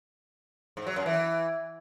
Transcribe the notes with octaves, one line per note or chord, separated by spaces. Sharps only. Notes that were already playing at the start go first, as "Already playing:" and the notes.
G#2
F#3
F#2
E3